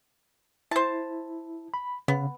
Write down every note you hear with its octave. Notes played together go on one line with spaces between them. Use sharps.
E4 C5 A5
B5
C#3 B3